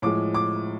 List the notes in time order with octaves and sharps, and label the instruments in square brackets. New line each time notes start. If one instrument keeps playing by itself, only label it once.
[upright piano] A2 F3 G#3 D6
D6